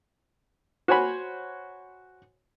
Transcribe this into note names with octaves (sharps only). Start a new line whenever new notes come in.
F#4 C5 C#5 G#5 B5